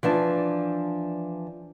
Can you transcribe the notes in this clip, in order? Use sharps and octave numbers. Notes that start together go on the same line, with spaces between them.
E3 F3 D4 A5